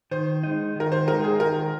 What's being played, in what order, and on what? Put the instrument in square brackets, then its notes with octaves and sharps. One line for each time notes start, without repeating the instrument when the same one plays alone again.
[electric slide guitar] D#3 [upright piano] C5
[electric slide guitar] G#3 D#4
[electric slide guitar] D#3 [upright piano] A#4
[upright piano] C5
[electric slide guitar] D#4 [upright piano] A#4
[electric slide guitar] G#3
[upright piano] G#4
[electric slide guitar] D#3 [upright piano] A#4